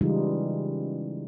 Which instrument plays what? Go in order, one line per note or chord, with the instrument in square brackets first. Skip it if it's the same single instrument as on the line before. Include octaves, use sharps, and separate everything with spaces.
[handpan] C#3 E3 G3 G#3 D#4 F4